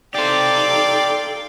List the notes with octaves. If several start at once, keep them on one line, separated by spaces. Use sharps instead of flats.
D#4 G4 A4 C5 D5 F5 G5